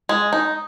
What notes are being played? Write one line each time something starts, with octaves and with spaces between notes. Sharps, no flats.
G#3
D#4